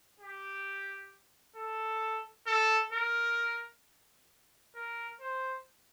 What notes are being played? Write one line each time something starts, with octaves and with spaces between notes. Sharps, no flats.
G4
A4
A4
A#4
A#4
C5